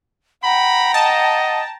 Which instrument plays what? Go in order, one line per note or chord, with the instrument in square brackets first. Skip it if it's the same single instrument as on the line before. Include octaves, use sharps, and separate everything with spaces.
[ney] F#5 [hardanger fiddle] G5 A#5 [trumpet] B5
[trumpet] D#5 [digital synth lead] A5